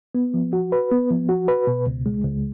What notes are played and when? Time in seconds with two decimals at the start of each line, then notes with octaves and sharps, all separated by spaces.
0.15 B3
0.34 F3
0.53 F#4
0.72 B4
0.91 B3
1.10 F3
1.29 F#4
1.48 B4
1.67 B2
1.87 C#2
2.06 G#3
2.25 C#2